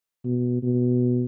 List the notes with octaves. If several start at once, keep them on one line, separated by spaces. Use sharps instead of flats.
B2
B2